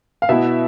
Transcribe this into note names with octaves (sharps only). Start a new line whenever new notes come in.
F5
B2 B3 E4 E5